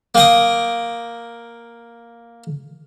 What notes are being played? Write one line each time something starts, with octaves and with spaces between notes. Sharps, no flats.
A#3 G5 D#6